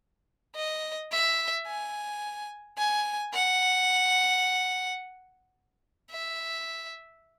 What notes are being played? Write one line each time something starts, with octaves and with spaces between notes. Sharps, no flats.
D#5
E5
G#5
G#5
F#5
E5